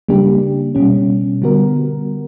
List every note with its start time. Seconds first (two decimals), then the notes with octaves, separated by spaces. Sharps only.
0.09 C#3 G3 A#3 D4 G4
0.75 B2 G3 C#4
1.42 D3 G3 B3 F#4 A#4